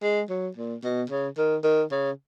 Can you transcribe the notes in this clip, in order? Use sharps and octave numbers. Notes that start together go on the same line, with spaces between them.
G#3
F#3
A#2
B2
C#3
D#3
D#3
C#3